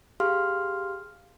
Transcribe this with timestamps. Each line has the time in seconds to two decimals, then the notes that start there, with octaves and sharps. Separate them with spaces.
0.20 G4 G#4 F5 C6 F6